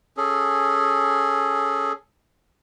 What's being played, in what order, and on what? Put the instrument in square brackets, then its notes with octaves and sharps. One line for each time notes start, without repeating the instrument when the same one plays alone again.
[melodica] C#4 G#4 A4